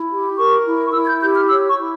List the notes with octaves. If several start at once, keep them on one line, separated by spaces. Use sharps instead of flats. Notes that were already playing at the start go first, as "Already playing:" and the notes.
Already playing: E4
G4
A#4 C#6
E4
C#6
E4 E6
G#6
G6
G4 G6
F6
C#5 E6
C#6
E4